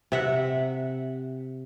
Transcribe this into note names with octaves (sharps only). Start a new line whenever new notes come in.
C3 E5 F#5